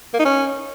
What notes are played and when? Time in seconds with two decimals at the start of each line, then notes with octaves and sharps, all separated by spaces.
0.14 A#3
0.20 D#4
0.25 C#4